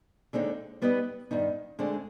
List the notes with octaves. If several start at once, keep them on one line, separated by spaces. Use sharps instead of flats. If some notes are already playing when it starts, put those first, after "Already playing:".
D#2 D3 G#3 C4 D#4
G3 B3 D#4 B4 D#5
G2 D#3 B3 D#4
D2 D3 G#3 C4